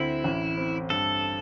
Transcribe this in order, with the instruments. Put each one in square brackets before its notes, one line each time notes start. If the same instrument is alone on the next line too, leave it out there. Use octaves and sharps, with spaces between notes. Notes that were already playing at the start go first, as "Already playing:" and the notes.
Already playing: [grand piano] D2 C4 [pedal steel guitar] E4
[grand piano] A1
C4
[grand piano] G2 [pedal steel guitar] A4